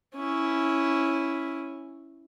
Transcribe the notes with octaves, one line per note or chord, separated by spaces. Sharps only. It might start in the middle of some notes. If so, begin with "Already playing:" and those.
C#4 E4